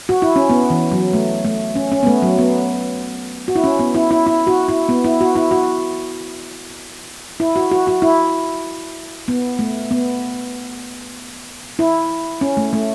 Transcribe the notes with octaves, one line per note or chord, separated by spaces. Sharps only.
F#4
E4
C#4
B3
E3
F#3
A3
A3
C#4
C#4
B3
A3
F#3
B3
F#4
E4
C#4
B3
E4
E4
E4
F#4
E4
B3
E4
F#4
E4
F#4
E4
F#4
F#4
F#4
E4
B3
A3
B3
E4
C#4
A3
A3